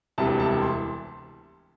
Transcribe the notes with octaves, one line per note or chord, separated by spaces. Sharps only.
E1 D2 C3 E3 G3 A5
A5
C6